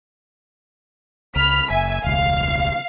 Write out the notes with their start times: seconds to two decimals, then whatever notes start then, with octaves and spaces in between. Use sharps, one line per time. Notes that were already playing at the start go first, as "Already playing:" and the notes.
1.36 C#2 B5 F6 B6
1.70 F#1 E5 G#5
2.04 E1 C#2 F5